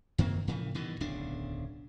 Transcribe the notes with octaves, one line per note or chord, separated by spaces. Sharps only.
F#2 D#3 A#3 C4
A2 C#3 E3 F3
G2 B2 D#3 E3
D1 B1 C#3 D4